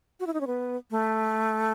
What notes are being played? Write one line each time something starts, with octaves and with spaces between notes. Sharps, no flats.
F#4
E4
D#4
C#4
B3
A3